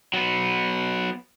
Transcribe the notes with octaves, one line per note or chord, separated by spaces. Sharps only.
F#3 B3